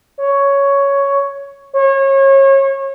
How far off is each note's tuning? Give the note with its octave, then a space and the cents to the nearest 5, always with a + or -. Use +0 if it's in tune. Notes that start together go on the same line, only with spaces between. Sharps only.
C#5 +5
C#5 -30